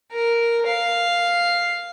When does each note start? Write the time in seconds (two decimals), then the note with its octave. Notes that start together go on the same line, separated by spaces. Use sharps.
0.12 A#4
0.67 F5